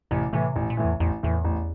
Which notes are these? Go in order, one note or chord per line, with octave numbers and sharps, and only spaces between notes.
A1 C3
A2 C3 E3
A1 A#2
A#2
A2 E3
E2
A1 E2
E2 A2 E3
A1